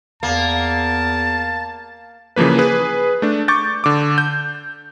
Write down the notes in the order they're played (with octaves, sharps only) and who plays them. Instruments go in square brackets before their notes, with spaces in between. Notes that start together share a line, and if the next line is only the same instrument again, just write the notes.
[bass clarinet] E2 [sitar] A#3 [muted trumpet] A5
[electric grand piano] C#3 E3 F3 A#3 B4
G#4 B4
A3 D4
C#6 D6 G6 A6
D3 D6
G6